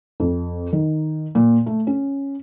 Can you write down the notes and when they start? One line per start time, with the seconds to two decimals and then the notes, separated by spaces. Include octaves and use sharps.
0.20 F2
0.73 D#3
1.35 A#2
1.66 A3
1.87 C#4